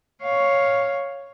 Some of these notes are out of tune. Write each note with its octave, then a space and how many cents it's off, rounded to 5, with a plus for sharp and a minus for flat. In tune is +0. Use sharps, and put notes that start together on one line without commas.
C#5 +0 F5 +0